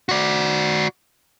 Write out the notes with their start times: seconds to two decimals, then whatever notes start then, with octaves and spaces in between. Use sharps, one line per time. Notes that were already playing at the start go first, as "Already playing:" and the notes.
0.09 F#4 D5